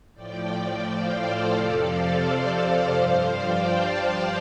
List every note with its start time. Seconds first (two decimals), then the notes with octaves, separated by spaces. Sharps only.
0.14 A2 F3 D5 G5
0.84 C5 F5
1.18 A4 D5
1.53 F2 C3 F3 A4 D5
1.87 C5 F5
2.57 C5 F5
2.91 G2 F3
3.26 D5 G5
3.61 F5 A5